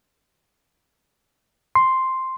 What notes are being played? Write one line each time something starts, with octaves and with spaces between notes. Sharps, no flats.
C6